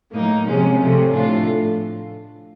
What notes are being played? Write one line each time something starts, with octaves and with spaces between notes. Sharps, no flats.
A2 F#3 A#3 D#4
C3 F3 G#3 C#4
C3 F3 A3 C#4
A2 F3 A3 D4 F4